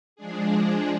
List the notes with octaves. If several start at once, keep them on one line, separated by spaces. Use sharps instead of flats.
F3 G#3 D4 G#4